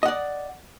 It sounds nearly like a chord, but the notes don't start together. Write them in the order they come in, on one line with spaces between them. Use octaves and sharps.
D#5 F#5 D5